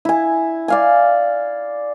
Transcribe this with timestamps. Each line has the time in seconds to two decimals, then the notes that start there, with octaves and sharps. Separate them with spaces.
0.05 E4 G#5
0.68 D5 F5 G#5